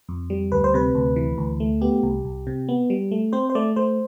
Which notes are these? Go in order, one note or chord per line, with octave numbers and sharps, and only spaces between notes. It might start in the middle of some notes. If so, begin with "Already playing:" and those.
F2
G3
D2 B4
C5
C3 B4
D2
E3
D2
A3
B3 G4
C2
C2
C3
B3
G3
A3
C4 C5
C5
A3 D5
A3 C5